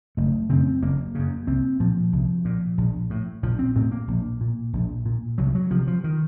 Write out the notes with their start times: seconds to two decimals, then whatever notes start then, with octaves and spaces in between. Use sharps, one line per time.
0.17 F#1 A3
0.49 F#2 C#3 C4
0.82 F#1 A#3
1.15 F#2 C#3
1.47 C2 C4
1.80 A#2 F3
2.12 C2
2.45 A#2
2.78 A#1
3.10 A2
3.43 A#1 F3
3.59 C4
3.76 A2 C4
3.92 A#3
4.08 A#1
4.41 A#2
4.73 A#1
5.06 A#2
5.38 C2 F#3
5.55 F#3
5.71 C3 F3
5.87 F3
6.04 D#3